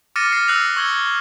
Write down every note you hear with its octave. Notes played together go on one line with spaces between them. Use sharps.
D6 F6 A6 A#6 C#7 D#7
F6 A6 C7
E6 F#6 A#6 C7 F7
C#6 E6 G#6 G7